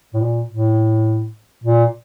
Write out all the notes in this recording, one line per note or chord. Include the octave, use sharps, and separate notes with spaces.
A2
A#2
A2
A#2